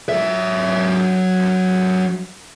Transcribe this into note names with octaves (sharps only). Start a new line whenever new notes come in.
F#3 E5